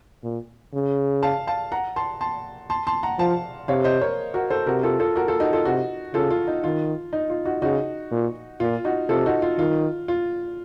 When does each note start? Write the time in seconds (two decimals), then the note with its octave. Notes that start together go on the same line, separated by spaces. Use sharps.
0.24 A#2
0.74 C#3
1.23 F5 A5
1.47 F5 A5
1.72 F#5 A#5
1.96 A5 C6
2.21 A5 C6
2.70 A5 C6
2.87 A5 C6
3.03 F#5 A#5
3.19 F3 F5 A5
3.68 C3 C#5 F5
3.84 C5 D#5
4.01 A#4 C#5
4.34 F#4 A#4
4.50 A4 C5
4.66 C3 F#4 A#4
4.83 F4 A4
5.00 F4 A4
5.16 F#4 A#4
5.28 F4 A4
5.40 D#4 F#4
5.53 F4 A4
5.65 C3 D#4 F#4
6.14 C#3 F4 A4
6.31 F4
6.47 D#4
6.64 D#3 F4
7.13 D#4
7.30 F4
7.45 D#4 F#4
7.62 C#3 D#4 F#4
8.11 A#2
8.60 A#2 F4
8.85 D#4 F#4
9.09 C3 F4 A4
9.26 D#4 F#4
9.42 F4
9.58 D#3 F4
10.08 F4